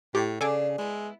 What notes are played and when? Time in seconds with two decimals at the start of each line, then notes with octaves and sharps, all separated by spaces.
0.15 A2 G4
0.41 C#3 D4 A4 G#5 D6
0.78 G#3 B3 E4